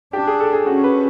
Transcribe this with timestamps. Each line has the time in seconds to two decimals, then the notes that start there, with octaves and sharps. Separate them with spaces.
0.13 D4 G4
0.27 G#4
0.40 A4
0.53 G#4
0.66 C#4 F#4
0.84 B4